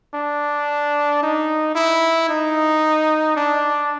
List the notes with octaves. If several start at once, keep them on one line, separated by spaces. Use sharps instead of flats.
D4
D#4
E4
D#4
D4